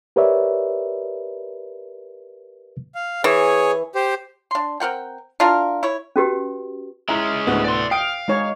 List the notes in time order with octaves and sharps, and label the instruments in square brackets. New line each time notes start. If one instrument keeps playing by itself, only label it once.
[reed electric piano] G4 A#4 B4 C#5 D5 E5
[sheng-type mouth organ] F5
[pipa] E3 [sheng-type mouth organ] G#4 C#5
[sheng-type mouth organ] G4 C5
[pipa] D4 C6
C4 A#4 F#5 G5
D4 E4 F4 A#4
E4 C#5
[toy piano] C#4 F#4 G4 B4
[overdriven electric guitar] G#3 C#4 [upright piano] E4 A#5 [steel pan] E5
[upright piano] D2 A2 B3
[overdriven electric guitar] D5 C6
[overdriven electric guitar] F5 [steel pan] G5 [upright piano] D#6 D7
[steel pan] G#3 D#4 C#5